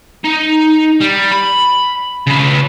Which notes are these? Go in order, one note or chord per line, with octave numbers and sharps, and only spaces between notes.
D#4
G3
B5
C#3 B4